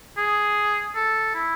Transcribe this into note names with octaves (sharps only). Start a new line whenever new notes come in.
G#4
A4
E4